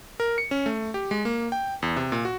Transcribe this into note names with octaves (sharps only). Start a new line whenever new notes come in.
A#4
C#7
C#4
A3
G4
G#3
A#3
G5
E2
C3
A#2
F#4